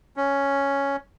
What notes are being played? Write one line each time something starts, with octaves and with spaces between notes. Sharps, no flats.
C#4